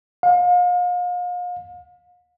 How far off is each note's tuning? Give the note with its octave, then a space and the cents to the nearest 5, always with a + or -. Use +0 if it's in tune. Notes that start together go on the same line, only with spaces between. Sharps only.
F5 +40